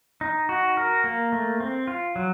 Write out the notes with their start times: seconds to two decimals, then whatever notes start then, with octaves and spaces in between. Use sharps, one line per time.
0.21 D#4
0.49 F#4
0.77 A#4
1.04 A#3
1.32 A3
1.60 C4
1.87 F4
2.16 F#3